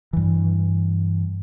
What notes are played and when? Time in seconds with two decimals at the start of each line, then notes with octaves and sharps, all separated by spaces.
0.13 G2 E3